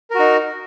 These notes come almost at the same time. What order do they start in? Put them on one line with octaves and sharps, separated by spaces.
A#4 F#4 D#4